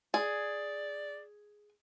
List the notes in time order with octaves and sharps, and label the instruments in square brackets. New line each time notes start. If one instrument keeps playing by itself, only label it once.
[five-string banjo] G#4 [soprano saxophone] D5